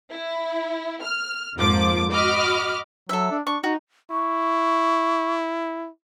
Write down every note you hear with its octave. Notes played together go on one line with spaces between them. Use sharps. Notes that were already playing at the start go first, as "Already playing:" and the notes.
E4
F6
F2 G#2 F3 A#3 D6
F#4 D#5 B5 D6 F6
F#3 A4 E5
D4
D4 C#6
D#4 F#4
E4 C#6